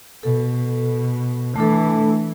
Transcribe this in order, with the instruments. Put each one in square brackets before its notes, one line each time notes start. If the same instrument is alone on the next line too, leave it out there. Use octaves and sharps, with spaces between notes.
[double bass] B2 [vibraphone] A4
[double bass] E3 [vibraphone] A3 D4 A4